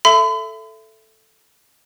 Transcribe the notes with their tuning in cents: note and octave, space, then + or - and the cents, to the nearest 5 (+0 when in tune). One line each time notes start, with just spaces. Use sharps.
A4 +0 E5 +15 B5 +45